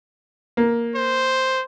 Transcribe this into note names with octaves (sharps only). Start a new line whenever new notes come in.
A#3
C5